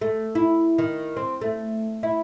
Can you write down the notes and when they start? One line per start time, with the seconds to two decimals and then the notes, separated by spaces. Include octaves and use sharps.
0.01 A3
0.35 E4
0.78 D#3
1.17 C4
1.41 A3
2.03 E4